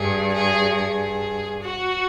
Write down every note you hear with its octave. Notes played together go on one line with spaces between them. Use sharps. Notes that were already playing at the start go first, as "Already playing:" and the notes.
Already playing: G2 G#4
G#4
G#4
F#4